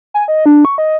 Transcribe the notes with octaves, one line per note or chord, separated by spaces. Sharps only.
G#5
D#5
D4
C#6
D#5